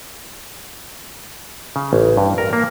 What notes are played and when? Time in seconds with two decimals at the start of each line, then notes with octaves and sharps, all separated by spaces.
1.76 C#3
1.93 A1
2.17 G2
2.38 A#4
2.53 A#3